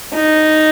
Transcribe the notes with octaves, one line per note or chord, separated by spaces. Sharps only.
D#4